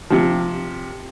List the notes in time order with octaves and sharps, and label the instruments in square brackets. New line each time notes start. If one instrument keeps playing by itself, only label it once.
[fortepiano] C3 F3